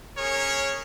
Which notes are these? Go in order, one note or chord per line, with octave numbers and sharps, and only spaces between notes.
C#4 G#4 A#4 C#5